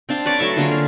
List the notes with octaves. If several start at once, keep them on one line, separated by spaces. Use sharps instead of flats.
C4 D4 F5
B4 C#5 D5
F#3 A3 E5 C#6
D3 A#3 F4 G#4
F5